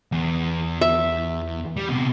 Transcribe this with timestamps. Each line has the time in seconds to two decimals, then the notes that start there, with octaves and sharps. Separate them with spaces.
0.12 E2
0.81 E5
1.77 G3
1.89 C3 B3